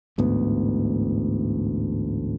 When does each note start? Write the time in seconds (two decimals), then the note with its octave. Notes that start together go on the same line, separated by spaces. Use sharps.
0.18 A1 D2 G#2 B3